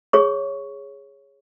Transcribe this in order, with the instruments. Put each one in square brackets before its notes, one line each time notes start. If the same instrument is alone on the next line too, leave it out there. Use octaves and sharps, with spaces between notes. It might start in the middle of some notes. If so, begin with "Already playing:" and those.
[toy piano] G#4 C#5 C#6